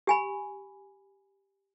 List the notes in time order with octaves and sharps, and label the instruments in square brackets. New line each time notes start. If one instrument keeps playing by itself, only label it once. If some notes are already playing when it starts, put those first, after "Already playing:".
[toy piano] G4 G#5 B5